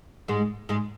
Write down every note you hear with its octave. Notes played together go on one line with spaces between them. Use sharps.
G#2 G#3
G#2 G#3